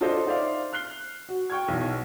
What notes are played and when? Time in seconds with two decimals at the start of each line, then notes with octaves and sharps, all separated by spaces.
0.01 D4 F4 A4 C5 D#5
0.26 D#4 C5 D5 E5 F5
0.73 F6 F#6 C7 G7
1.29 F#4
1.50 G5 C#6 F6 G#6
1.68 B1 E2 B2